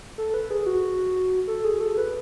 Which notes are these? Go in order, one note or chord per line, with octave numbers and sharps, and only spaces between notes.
A4
B4
G#4
F#4
A4
G#4
A4
B4